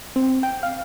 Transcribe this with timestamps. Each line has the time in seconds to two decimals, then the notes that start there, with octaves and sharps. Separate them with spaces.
0.16 C4
0.43 G5
0.63 F5